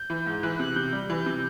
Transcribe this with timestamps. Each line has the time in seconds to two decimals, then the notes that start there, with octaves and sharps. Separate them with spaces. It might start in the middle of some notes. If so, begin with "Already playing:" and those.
Already playing: G6
0.10 E3
0.26 G#2
0.43 E3 F#6
0.60 C3 F#6
0.76 C3 G6
0.93 G3
1.10 E3
1.26 C3